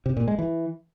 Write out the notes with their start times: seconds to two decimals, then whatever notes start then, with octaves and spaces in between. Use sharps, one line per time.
0.06 C3
0.17 A#2
0.28 G#3
0.39 E3